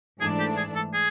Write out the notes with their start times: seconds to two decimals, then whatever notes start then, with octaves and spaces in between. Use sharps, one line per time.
0.21 G#2 E3 A3 D4 G#4
0.39 G4
0.57 G#4
0.75 A4
0.94 G#4